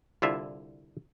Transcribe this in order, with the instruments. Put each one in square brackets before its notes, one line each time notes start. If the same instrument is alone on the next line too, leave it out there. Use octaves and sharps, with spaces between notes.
[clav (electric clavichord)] C2 D3 E4 F4 E5